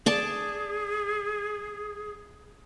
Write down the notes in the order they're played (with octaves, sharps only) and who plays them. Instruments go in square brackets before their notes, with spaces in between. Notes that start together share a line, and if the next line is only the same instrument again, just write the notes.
[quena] G#4 [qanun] D5 A5